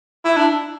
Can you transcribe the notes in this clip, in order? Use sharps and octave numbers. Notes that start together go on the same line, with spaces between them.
E4
D4